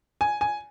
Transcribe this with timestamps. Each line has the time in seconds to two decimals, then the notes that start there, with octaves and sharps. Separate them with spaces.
0.21 G#5
0.41 G#5